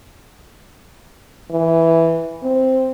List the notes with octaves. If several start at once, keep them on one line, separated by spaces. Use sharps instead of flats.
E3
C4